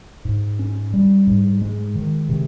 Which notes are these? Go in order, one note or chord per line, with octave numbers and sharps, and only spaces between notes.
G#2
C#4
G3
G#2
G#3
D#3
C3